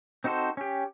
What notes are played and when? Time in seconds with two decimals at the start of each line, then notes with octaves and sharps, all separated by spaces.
0.24 C4 D#4 F#4 A4 C5
0.57 C#4 G4